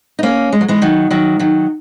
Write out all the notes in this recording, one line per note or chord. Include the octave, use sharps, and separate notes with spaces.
D#4
A#3 C#4
G#3
F#3
E3 G#3
D#3 F#3
D#3 F#3
D#3 F#3